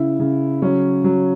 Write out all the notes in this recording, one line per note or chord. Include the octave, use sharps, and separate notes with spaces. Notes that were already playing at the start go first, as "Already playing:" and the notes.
Already playing: C#3 E4
C#3
F#3 C#4
F#3